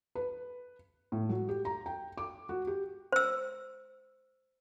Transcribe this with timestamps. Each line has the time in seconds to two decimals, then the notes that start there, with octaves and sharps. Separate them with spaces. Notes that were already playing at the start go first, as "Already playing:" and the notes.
0.15 B4
1.12 A2
1.29 F#3
1.49 G4
1.65 A#5
1.86 G5
2.18 D6
2.49 F#4
2.67 G4
3.12 C5 E6